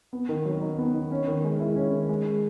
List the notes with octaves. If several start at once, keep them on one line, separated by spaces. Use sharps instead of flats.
B3
D#3
F#3
D#4
B3
D#3
C#4
D#3
G#3
E4
C#4
D#3
G#3